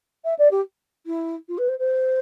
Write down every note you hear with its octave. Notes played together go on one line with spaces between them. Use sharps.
E5
D5
G4
E4
F4
B4
C5
C5